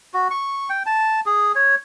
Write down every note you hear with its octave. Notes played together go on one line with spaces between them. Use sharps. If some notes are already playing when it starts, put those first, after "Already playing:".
F#4
C#6
G5
A5
G#4
C#5